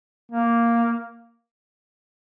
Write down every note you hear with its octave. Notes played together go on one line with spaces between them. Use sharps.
A#3